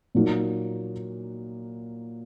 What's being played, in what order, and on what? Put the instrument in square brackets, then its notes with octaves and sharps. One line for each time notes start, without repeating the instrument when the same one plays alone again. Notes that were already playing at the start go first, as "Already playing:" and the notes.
[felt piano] A#2 F#3 A#3 D#4